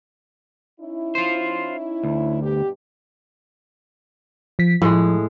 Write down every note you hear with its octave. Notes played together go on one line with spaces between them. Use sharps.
C#4 D#4 E4
F4 C5
D2
G2 B2 G4
F3 B6
A2 F3 G#3